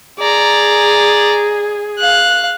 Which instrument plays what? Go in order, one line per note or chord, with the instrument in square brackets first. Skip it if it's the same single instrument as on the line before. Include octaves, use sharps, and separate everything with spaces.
[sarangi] G#4 [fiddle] D5 A#5
[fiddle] F5 F#6